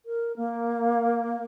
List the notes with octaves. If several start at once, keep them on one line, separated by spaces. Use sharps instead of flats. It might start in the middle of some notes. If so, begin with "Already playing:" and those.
A#4
A#3